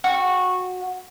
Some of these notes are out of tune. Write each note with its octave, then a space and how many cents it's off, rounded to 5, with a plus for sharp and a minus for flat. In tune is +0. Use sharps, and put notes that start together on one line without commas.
F#4 -15